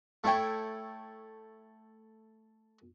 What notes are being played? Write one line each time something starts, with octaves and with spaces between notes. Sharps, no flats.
A3 E4 C#5 G5